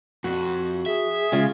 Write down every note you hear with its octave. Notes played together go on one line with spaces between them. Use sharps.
F2 F#4
G#4 E5
C#3 G#3 F4